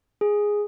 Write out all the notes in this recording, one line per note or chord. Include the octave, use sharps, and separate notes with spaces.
G#4